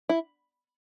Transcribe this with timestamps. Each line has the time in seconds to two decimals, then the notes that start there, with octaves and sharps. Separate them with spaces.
0.09 E4